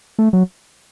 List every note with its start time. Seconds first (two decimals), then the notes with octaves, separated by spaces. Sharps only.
0.19 A3
0.33 F#3